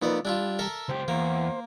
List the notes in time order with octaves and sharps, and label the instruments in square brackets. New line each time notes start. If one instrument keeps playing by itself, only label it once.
[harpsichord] F2 B3 D5 [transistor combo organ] A#3 D#4 B4
[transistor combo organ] G3 [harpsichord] D4 E4 F4
[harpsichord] A4 A#4 E5
[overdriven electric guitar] C#2 G4 [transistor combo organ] C5
[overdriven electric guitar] E2 [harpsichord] A#3